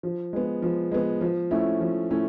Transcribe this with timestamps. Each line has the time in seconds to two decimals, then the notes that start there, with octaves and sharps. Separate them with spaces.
0.03 F3
0.33 G#3 B3
0.62 F3
0.92 G#3 B3
1.21 F3
1.51 A3 C#4 E4
1.81 F3
2.11 A3 C#4 E4